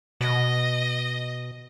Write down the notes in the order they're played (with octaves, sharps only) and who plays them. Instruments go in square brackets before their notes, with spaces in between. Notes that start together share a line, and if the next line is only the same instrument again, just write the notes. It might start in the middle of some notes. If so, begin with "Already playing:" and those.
[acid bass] B2 [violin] D#5